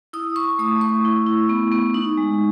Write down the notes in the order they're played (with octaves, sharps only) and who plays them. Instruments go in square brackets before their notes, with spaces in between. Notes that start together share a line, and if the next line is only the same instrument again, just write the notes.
[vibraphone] E4 D#6
E4 C#6
A3 D#6
A3 C#6
E4
E4
B3
B3
D#4
G#3